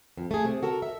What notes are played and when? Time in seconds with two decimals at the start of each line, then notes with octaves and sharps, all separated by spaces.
0.17 F2
0.31 A3 G#4
0.45 C3
0.63 F#4 A4 A#4
0.82 E5